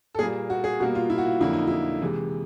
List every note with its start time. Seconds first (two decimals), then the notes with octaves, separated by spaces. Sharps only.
0.15 A4
0.18 A#2 G3 A#3 G#4
0.50 F#4
0.64 G#4
0.80 B2 G3 A#3 F#4
0.95 F4
1.10 E4
1.18 F#4
1.26 F4
1.41 F2 D3 F#3 A#3 E4
1.53 D#4
1.67 E4
2.02 C3 E3 G#3